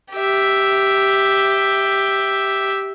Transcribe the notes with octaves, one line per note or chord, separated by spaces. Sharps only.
G4 E5